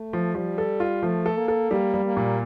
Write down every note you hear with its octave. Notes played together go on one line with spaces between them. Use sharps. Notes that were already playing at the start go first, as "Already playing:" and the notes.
Already playing: A3
F3
F3 G3
A4
F4
F3 A3
A4
A#3
A4
G3 A#3
G3
A#3
A#2